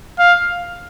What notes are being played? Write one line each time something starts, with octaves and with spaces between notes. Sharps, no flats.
F5